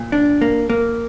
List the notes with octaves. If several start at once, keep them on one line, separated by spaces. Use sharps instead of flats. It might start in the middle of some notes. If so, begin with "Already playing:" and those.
Already playing: A#2
D4
A#3
A#3